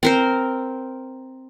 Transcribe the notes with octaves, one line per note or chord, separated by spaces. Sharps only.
C4 A#4 C5